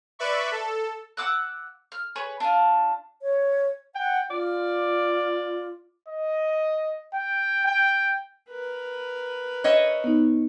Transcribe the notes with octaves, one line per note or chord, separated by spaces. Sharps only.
B4 D5 E5 B5 C#6
A4
F#5 D6 E6 F#6
F6
G#4 B4 C#5
D4 F4
C#5
F#5 G5
F4 D5
D#5
G5
G5
A#4 B4
C#5 D#5 E5
B3 D#4